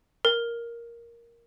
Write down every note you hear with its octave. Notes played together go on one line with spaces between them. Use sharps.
A#4